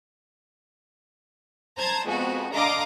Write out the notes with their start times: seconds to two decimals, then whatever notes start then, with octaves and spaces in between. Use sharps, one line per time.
1.78 C5 A5 A#5 G#6
2.06 F2 G#3 B3 F#4
2.53 D3 D#5 F5 A#5 D6